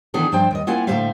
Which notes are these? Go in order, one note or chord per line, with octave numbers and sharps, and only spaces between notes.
D#3 E3 B3 D4 G#4 A4
G2 F3 D4 C5 G5
D#2 D#5
A#3 C4 E4 F4 F#5 G#5
A2 D3 A3 C5 E5 F5